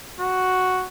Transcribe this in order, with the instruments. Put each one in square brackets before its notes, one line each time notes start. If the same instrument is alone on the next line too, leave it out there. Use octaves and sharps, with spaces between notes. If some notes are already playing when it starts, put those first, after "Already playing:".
[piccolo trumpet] F#4